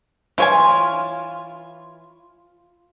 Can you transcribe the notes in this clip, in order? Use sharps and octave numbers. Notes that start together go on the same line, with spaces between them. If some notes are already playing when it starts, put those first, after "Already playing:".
E3 F4 C#5 G#5